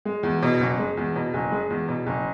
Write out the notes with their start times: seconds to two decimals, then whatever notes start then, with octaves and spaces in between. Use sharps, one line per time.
0.05 G#3
0.23 E2
0.43 B2
0.60 F#1
0.79 G#3
0.97 E2
1.16 B2
1.34 F#1
1.52 G#3
1.70 E2
1.88 B2
2.06 F#1